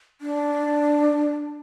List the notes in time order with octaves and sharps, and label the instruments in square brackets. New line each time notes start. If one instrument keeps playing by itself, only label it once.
[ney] D4